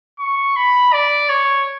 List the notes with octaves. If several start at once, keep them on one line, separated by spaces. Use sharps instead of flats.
C#6
B5
D5
C#5